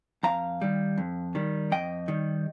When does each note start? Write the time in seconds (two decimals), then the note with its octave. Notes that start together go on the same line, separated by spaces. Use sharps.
0.23 F2 F5 A#5
0.61 D#3 G3
0.98 F2
1.35 D#3 G3
1.72 F2 D#5 G5
2.08 D#3 G3